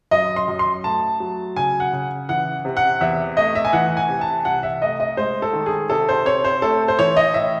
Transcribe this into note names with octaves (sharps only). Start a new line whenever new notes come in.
F#2 D#5
C6
F#2
C6
A3 A5
F#3
C#3 G#5
F#5
C#3
E3 F#5
C3
F#5
E2 E5
A3 D#5
E5
G#5
E3 F#5
G#5
C3
A5
C2 F#5
E5
A3 D#5
D#5
G#3 C5
A4
D#3
G#4
C3 A4
C5
C4 C#5
C5
A3 A4
C5
E3 C#5
D#5
A2 E5